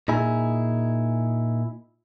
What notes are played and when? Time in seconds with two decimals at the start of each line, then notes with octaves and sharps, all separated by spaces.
0.08 A#2 D#4 E4 G#4